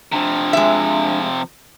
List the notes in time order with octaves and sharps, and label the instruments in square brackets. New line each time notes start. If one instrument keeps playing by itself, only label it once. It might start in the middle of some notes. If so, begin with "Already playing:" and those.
[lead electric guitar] C3 F3 [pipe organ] D4
[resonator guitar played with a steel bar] G#3 E5